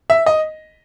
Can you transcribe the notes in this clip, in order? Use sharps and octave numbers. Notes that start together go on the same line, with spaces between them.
E5
D#5